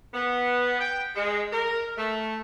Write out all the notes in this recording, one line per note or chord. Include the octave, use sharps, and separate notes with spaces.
B3
G5
G#3
A#4
A3